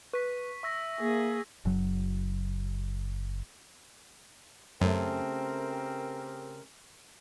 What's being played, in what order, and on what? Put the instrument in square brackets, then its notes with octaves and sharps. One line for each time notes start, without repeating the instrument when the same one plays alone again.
[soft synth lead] B4 [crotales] C#6 B6
[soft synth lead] E5 [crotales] C#6 E6 A#6
[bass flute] A#3 [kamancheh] G#4
[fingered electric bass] F#1 F#3
[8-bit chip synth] F#2 [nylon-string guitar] C#3 A3 [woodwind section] C4 G4 A#4